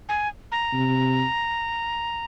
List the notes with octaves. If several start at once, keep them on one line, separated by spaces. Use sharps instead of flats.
G#5
A#5
C3